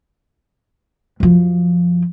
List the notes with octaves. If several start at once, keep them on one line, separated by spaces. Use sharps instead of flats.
F#2 F3